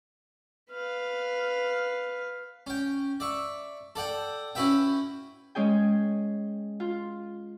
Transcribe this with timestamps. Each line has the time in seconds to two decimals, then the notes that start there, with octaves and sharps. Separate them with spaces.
0.71 B4 F5
2.67 C#4 G5
3.20 D5 E5 C#6
3.96 A4 D5 F#5 G5
4.55 C#4 E4 F#4 B4 E5 G5
5.55 G#3 C#4 G#4 G5
6.80 F4